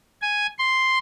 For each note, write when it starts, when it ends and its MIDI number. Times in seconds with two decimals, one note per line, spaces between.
0.22 0.47 80
0.59 0.99 84